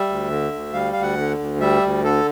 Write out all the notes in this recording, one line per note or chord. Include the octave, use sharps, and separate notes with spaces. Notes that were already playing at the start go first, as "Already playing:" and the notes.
Already playing: G3 E5
D2
D3
D2
G3 F5
D2 F5
F#5
D3
D2
G3 E5
D2
D3 A4